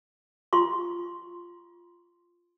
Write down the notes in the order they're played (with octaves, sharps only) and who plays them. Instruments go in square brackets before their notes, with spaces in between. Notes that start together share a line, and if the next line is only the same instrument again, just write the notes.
[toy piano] F4 C6 C#6